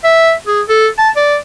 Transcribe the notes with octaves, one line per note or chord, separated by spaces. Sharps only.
E5
G#4
A4
A5
D5